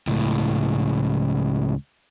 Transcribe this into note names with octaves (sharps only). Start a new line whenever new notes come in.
C#2 A2